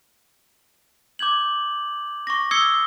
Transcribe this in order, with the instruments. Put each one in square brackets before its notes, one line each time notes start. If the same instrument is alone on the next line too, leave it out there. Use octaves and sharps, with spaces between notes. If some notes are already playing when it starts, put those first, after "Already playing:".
[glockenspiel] D6 G6 G#6 F#7
C#6 D6 A#6
D#6 E6 G#6 C7 C#7 G7